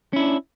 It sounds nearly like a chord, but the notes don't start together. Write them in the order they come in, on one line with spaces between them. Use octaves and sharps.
C#4 E4 D4